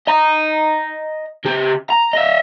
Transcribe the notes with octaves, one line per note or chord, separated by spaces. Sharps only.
D#5 A#5
C#3 G4
A#5
D#5 E5